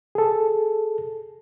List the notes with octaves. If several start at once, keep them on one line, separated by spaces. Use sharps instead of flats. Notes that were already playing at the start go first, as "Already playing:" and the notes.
G#4 A4